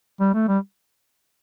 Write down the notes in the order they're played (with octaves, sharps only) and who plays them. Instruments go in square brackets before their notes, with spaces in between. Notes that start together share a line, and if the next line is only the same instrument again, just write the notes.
[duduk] G3
A3
G3